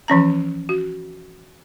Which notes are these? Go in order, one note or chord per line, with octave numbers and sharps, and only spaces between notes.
E3 F3 C#4 A#5
F#4